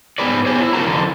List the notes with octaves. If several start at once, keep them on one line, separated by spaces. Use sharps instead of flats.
G#2 G3 B3 G#4 B4 D5
B3 G4 G#4 C5 C#5
E4
C#3 A3 F#4 A#4 F#5 A#5
F2 A#2 D3 E3